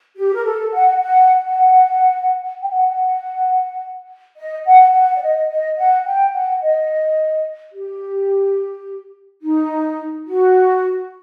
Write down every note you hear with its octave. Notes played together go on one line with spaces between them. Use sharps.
G4
A#4
A4
F#5
F#5
F#5
G5
F#5
D#5
F#5
F#5
D5
D#5
D#5
F#5
G5
F#5
D#5
G4
D#4
F#4